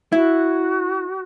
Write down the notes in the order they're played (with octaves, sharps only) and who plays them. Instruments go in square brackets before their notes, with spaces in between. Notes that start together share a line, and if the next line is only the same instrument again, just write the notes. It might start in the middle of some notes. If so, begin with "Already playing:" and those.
[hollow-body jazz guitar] E4 [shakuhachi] F#4